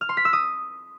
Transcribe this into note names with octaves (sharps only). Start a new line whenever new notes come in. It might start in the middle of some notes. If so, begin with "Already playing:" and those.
F6
C6
B6
E6
D#6